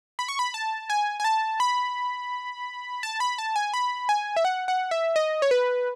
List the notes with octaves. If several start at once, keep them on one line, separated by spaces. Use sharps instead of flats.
B5
C#6
B5
A5
G#5
G#5
A5
B5
A5
B5
A5
G#5
B5
G#5
E5
F#5
F#5
E5
D#5
C#5
B4